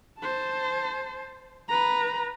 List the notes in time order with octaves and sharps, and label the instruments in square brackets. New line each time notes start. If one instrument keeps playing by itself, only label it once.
[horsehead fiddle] C5 A5
B4 A#5